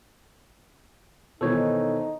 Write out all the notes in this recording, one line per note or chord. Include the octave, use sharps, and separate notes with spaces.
B2 D#3 E3 D#4 A4 C5 C#5